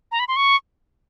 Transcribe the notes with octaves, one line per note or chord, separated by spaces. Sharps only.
A#5
B5
C6
C#6